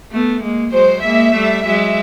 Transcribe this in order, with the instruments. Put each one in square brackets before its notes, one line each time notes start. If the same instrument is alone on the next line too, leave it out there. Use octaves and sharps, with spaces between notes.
[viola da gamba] A3 B3
G#3 A#3
[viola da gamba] F#3 G#3 [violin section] C5
[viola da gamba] G#3 A#3 [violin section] E5
[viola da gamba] G3 A3
[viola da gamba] F#3 G#3 [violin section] E5